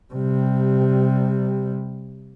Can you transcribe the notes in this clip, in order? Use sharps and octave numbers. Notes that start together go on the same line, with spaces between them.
C3 G3